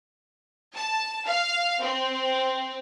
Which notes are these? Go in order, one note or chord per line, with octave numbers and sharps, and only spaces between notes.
A5
F5
C4